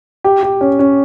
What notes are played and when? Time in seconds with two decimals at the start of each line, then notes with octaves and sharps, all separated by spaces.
0.24 G4
0.43 G4
0.61 C#4
0.79 C#4